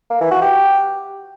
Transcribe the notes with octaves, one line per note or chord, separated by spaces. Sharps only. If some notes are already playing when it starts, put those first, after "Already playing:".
A#3
E3
F#4
G4